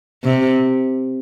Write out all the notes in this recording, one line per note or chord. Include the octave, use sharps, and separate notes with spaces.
C3